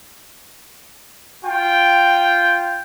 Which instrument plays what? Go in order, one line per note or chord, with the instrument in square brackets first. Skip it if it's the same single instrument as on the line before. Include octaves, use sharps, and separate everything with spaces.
[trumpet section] F4 G5